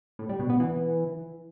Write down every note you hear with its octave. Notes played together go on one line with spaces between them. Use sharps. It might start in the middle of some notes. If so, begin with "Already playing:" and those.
A2
G3
B2
B3
E3